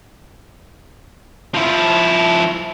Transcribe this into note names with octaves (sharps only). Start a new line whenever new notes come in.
F3 E4